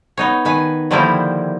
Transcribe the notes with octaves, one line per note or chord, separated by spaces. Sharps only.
B3 D#4 C#5
D#3 B4 G#5
D3 D#3 F3 G3 A#3 E4